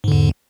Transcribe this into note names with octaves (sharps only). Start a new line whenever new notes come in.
E2 G#2 D3